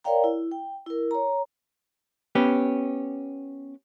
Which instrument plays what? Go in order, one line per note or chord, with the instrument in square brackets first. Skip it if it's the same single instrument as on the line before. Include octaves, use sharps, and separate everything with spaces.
[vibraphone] A#4 C#5 D5 F5 G5 A#5
E4
G5
E4 A#4
C#5 A#5
[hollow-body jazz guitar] B3 C#4 G4